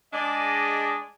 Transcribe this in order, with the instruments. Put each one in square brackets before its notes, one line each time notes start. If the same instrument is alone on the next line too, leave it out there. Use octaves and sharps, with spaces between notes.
[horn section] G#3 D4 G#4 D5 D#5